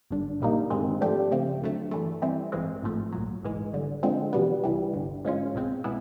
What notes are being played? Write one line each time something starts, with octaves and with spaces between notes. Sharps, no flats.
G#1 G2 D3
B1 A#2 G3 A#3 D#4
G1 G2 D#3 G#3 C4
G#2 F3 A3 D4 G4
C#3 F3 A3 C4
D#2 D3 F#3 A3
G2 E3 A3
E3 G3 C4
A1 G2 E3 G#3 C4
G#1 G#2 F3 A3
C2 A#2 F#3
G#1 G#2 E3 G#3
G1 G2 D3
D3 F3 G#3 C4
E2 B2 G3 B3
C2 C3 E3 G3
G1 G2 D3
G#2 F3 G#3 C#4 F4
C2 B2 G#3 C4
B2 G#3 B3 E4